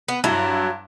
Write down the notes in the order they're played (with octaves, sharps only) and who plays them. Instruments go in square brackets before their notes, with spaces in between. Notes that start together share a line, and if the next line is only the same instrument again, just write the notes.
[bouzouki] B3
[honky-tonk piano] G2 E4 A5 [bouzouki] F#3